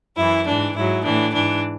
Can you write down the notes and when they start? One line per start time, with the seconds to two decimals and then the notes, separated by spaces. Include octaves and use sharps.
0.17 F#2 E3 E4
0.46 G#2 E3 D4
0.75 G#2 F#3 E4
1.03 A2 E3 D4
1.33 G#2 E3 D4